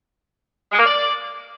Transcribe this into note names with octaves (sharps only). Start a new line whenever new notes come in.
G#3
A#3
D5